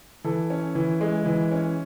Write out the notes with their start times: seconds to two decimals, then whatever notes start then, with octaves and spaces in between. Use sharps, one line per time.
0.24 E3 A4
0.50 C#4
0.75 E3
1.01 G#3
1.25 E3
1.52 C#4